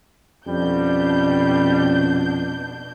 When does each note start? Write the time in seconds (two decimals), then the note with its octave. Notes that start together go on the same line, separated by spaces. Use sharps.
0.47 F2 B2 G3 C#4 D4 G6